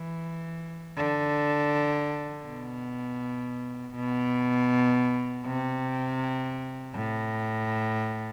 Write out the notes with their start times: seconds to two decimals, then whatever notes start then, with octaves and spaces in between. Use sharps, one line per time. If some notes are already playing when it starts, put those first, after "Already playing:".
Already playing: E3
0.97 D3
2.46 B2
3.95 B2
5.45 C3
6.94 A2